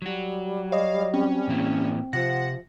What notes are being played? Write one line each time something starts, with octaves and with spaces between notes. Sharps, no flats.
F#3 G3 F#4
C#5 D#5 F5 D#6
C4 C#4
A2 E3 A#3
C3 F3 F#5 A#6